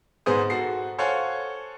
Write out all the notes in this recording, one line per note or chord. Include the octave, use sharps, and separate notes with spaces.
G#2 B3 G#4 C5 D#6
F#4 A4 C7
A4 C5 C#5 F5 F#5 G#5